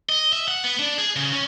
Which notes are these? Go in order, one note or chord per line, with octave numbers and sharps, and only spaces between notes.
D#5
E5
F#5
B3
D4
G#4
C#3
C#4